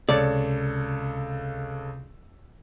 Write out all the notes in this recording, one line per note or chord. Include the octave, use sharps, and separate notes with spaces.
C#2 C3 A4 C#5 D5